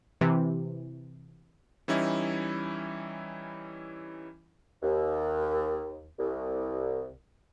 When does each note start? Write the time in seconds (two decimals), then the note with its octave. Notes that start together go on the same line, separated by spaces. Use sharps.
0.21 C3 E3
1.88 E3 G3 C#4 D#4 E4
4.83 D#2
6.19 C2